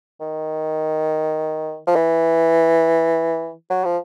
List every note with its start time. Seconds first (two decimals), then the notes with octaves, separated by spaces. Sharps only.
0.21 D#3
1.87 F3
1.95 E3
3.70 F#3
3.85 F3